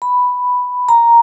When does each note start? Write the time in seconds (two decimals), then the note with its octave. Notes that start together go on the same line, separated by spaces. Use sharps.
0.02 B5
0.89 A#5